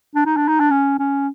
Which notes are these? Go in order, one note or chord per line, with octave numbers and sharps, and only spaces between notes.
D4
D#4
D4
D#4
D4
C#4
C#4